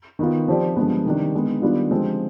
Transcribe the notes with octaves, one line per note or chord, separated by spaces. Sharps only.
D#3 B3 F4
F3 C4 G4 D5
G2 D3 F3 G#3 B3
C3 D#3 G3 D4
D3 G#3 B3
D#3 G3 B3 D4 F4
D3 F3 G#3 C4 G4